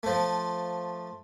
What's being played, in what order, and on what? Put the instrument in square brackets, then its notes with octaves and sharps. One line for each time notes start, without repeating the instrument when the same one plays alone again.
[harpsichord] F3 A3